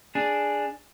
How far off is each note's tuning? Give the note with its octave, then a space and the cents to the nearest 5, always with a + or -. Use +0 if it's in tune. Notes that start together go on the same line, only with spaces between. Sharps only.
D4 +0 G#4 +0